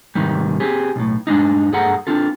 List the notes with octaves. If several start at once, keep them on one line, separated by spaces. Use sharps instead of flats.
G#2 C3 D#3 G3
C4 G4 G#4
B1 A2
G2 G#3 D4 D#4
G2 G#4 A4 F#5 A#5
C4 D4 F4 A4